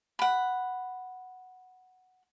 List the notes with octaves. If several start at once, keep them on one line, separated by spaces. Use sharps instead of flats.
F#5 B5